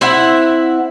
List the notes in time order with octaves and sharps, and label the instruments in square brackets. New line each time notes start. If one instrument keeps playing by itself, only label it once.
[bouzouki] C4 E4 E5 F#5